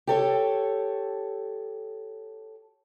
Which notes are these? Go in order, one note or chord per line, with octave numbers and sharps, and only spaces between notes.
G4 A4 C#5